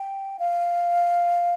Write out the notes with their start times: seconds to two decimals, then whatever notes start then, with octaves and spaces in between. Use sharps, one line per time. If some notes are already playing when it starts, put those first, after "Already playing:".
Already playing: G5
0.39 F5